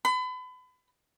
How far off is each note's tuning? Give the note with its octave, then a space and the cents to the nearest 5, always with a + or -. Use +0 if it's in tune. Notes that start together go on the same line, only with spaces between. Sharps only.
B5 +35